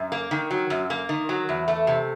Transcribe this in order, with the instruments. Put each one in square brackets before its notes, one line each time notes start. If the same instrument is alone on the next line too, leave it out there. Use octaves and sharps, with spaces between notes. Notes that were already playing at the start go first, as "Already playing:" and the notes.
Already playing: [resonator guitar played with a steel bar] F#2
A#3
D#3
F#3
F#2
A#3
D#3
F#3
E2
A3
C3